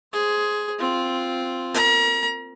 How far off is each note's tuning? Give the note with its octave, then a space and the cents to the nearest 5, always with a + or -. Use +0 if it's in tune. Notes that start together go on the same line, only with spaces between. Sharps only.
G#4 +10 C5 +5
C4 +0 F4 +0
A#4 -30 A#5 +40